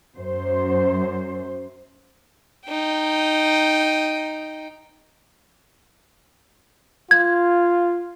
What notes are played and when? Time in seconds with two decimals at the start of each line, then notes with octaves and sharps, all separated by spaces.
0.17 F#2 C5
2.67 D#4 G5
7.11 F4 G#6